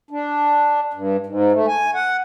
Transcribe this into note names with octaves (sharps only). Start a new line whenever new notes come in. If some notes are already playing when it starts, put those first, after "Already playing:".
D4
G2
G#2
A3
G#5
F#5